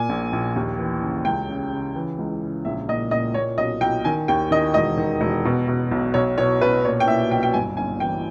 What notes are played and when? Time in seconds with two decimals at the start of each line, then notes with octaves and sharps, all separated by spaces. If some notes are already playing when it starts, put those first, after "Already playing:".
Already playing: A#2 G#5
0.09 A#1
0.33 A#1
0.56 D#2
0.79 E3
1.02 C#3
1.25 C#2 G5
1.49 C#3
1.73 C#3
1.96 E3
2.19 C#2
2.42 C#3
2.65 A#1 E5
2.89 A#2 D#5
3.11 A#2 D#5
3.34 A#2 C#5
3.58 B1 D#5
3.81 B1 G5
4.05 D#3 G#5
4.28 D#2 G5
4.51 D#3 D#5
4.74 E1 D#5
4.97 D#3
5.21 E1
5.45 B2
5.68 B2
5.91 B1
6.14 B1 C#5
6.38 B2 C#5
6.61 B2 B4
6.84 A#2 C#5
7.00 G5
7.07 A#2 E5
7.31 B1 G5
7.43 G5
7.54 G1 G#5
7.77 G1 G#5
8.00 E3 G5